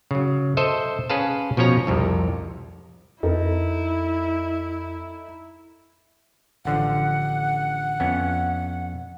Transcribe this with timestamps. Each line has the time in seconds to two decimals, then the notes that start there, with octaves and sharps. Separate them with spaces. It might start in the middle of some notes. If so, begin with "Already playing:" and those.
0.11 C#3 F#3
0.57 A4 C5 D#5 E5
1.10 C#4 G#4 B4 F5 A5
1.57 B2 F3 C#4 C#5 A#5
1.87 C2 F2 C3
3.23 F2 D#4 E4 A4 A#4
6.65 A1 D3 F3 F#5
8.00 F2 B3 C#4